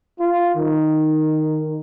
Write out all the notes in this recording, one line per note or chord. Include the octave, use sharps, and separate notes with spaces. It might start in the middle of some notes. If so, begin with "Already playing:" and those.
F4
D#3